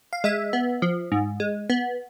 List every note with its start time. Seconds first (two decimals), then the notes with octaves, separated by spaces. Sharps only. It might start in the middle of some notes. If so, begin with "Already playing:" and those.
0.13 F5
0.24 G#3 E5
0.53 B3
0.82 F3
1.12 G#2
1.40 G#3
1.70 B3